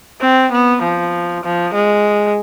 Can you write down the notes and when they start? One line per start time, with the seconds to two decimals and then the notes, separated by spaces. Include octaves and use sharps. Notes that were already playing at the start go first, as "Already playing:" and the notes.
0.22 C4
0.52 B3
0.83 F3
1.44 F3
1.74 G#3